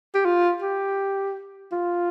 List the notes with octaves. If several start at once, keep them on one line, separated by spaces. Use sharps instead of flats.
G4
F4
G4
F4